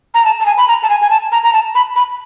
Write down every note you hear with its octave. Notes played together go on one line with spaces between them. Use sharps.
A#5
A5
A5
G#5
B5
A#5
A5
G#5
G#5
A5
A#5
A#5
A5
B5
B5